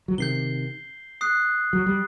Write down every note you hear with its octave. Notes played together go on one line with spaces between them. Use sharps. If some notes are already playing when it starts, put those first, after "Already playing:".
F#3
C3 D#3 G6 C7 G7
D#6 F#6 C7
F#3
G3